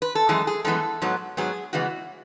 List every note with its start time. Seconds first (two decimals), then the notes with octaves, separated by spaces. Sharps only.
0.02 B4
0.15 A4
0.29 F#2 E3 G#3 G#4
0.47 G#4
0.65 F#2 E3 G#3 B3 A4
1.02 G#2 F#3 B3
1.37 G#2 F#3 B3 G#4
1.73 C#3 E3 G#3 B3 F#4